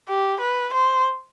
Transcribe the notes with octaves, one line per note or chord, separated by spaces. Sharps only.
G4
B4
C5